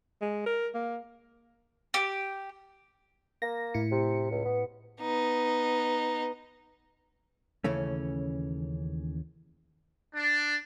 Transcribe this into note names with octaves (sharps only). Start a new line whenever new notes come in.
G#3
A#4
A#3
G4
A#3 A#6
A2 E4 C#7
C3
C#2
B3
B3 D#4
D#2 C#3 E3 A3 C#4
D4